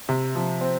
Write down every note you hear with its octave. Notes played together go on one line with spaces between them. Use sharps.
C3
F3
C4